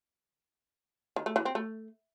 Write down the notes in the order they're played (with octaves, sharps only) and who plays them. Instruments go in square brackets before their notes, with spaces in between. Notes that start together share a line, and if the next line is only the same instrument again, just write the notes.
[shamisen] D#3
A3
E3
C4
A3